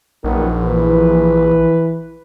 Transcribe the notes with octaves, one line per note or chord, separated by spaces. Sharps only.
A#1 F#2 D#3 B3
E3 B4